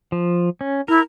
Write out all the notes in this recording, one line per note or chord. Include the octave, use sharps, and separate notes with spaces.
F3
C#4
E4 A#4